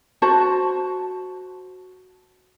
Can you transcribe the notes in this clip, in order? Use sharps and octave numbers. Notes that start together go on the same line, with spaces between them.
F#4 C5 A5